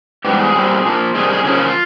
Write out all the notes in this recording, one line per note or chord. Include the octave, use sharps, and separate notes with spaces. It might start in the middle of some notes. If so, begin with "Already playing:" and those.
G#2 E3 G3 B3 G4
G#4
A#2 G3 C4
A#2 F3 A#3
C3 D#3 G3 G#4
G#4
C#3 F3 A#3 C#4 G#4
F4